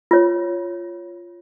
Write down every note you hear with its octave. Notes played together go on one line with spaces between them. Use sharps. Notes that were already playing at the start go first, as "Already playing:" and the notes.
F4 C#5